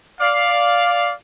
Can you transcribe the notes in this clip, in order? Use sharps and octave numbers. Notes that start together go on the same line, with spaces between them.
D5 F5